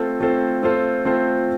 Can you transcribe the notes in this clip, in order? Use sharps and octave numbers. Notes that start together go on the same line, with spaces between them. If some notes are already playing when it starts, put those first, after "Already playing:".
Already playing: A3 C4 F4 A4 C5
A3 C4 F4 A4 C5
A3 C4 F4 A4 C5
A3 C4 F4 A4 C5